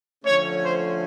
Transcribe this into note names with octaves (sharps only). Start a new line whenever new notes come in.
D3 F3 A3 C#4 C#5
C5